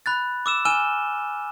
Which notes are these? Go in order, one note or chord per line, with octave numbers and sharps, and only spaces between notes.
B5 F#6 A6
D6 E6 E7
G#5 E6 F6 D#7 E7 G7